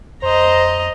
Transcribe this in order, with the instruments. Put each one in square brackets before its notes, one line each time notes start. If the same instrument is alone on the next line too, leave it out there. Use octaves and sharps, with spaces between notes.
[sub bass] F2 [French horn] C5 [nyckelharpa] D#5 A#5